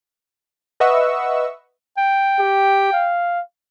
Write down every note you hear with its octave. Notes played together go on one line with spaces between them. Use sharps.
B4 D#5 E5 F#5 C#6 E6
G5
G4
F5